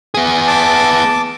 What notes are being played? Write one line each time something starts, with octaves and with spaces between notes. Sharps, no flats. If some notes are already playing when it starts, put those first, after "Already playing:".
B3 G#4
A5 D6